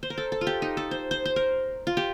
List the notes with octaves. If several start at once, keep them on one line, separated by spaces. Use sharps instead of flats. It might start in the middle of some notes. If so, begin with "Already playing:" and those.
C5
A#4
A4
A4
F4
G4
D#4
A4
C5
C5
C5
A#4
F4
G4